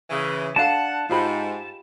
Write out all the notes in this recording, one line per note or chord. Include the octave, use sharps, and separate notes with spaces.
C#3 E3
D4 A4 F5 F#5 A5
G#2 F4 G4 B5